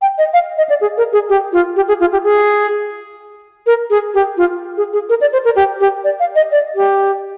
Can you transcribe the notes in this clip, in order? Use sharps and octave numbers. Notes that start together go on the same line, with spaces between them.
G5
D#5
F5
D#5
D5
G#4
A#4
G#4
G4
F4
G4
G#4
F4
G4
G#4
A#4
G#4
G4
F4
G#4
G#4
A#4
D5
C5
A#4
G4
G4
D5
F5
D#5
D5
G4